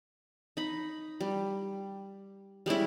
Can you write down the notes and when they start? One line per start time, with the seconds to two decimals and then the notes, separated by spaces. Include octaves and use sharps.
0.57 D#4 B5
1.21 G3
2.66 G3 G#3 C#4 E4